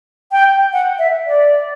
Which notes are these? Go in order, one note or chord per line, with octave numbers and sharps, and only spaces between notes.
G5
F#5
E5
D5